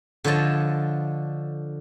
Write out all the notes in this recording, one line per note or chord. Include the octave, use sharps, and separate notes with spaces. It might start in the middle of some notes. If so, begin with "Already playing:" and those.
D3 F3 C#5 D#5 A5